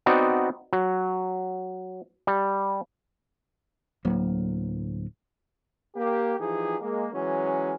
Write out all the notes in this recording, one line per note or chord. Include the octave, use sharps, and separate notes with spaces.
B3 C4 D#4 F#4 D5
F#3
G3
D1 F#3 A#3
A#3 G4
E3 F3 D#4 G4 G#4
G#3 A#3
E3 F#3 G#3 C#4